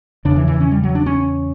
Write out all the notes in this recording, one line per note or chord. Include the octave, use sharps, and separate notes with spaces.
E2 C#3 D4
E3
E3
C#4
G3
F#3
D4
C#4